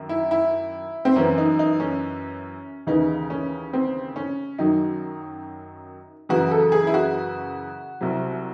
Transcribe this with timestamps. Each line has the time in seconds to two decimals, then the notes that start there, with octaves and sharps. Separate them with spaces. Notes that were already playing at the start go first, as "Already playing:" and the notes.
Already playing: F#2 D#3
0.09 E4
0.31 E4
1.05 C4
1.16 F#2 E3 C#4
1.38 D#4
1.59 D#4
1.80 C#4
2.87 D#2 C#3 E3 D#4
3.30 C#4
3.73 C4
4.16 C#4
4.58 F#2 D#3 F#3 D#4
6.29 F#2 C#3 E3 F#4
6.51 A4
6.72 G#4
6.87 E4
6.94 F#4
8.01 C2 C3 F#3